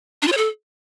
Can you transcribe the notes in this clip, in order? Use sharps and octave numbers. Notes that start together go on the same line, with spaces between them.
D4
F4
C#5
A4